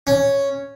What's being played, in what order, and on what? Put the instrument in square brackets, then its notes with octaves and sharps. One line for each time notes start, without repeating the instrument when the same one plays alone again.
[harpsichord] C#4